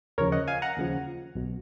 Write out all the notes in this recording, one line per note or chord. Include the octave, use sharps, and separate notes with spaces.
D#2 C#3 F3 A#4 C#5
D#5 F#5
F5 G#5
F#5 A#5
D#2 C#3 F3
B1 B2